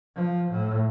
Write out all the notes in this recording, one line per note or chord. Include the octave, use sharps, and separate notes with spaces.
F3
A2